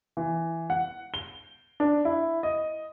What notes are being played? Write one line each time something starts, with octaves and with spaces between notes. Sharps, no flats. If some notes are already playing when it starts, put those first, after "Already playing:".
E3
F#5
G7
D4
E4
D#5